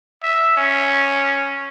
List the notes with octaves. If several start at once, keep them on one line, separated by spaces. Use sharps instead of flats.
E5
C#4